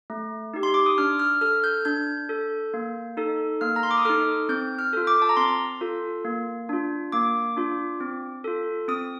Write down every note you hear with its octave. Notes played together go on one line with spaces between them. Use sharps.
A3
D#4 G4
C6
D6
D#6
D4 F6
F6
A4 F6
G6
D4 G6
A4
A#3
D#4 A4
A#3 F6
A#5
C6
D6
D#6
D#4 A4 F6
C4 G6
F6
F4 A4
D6
A5
A#5
C4 C6
F4 A4
A#3
D4 F4
A#3 D6
D4 F4
C4
F4 A4
C4 D#6